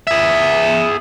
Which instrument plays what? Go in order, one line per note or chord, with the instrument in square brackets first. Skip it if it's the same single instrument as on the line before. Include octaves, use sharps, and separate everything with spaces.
[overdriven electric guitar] G#4 E5